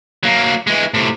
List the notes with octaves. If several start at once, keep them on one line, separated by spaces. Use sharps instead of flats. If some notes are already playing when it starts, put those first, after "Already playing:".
F#3 A#3
E3 G#3
A2 C3